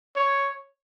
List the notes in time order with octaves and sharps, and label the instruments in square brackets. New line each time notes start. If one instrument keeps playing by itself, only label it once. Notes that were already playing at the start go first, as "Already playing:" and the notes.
[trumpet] C#5